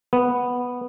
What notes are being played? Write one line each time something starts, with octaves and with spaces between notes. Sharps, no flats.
B3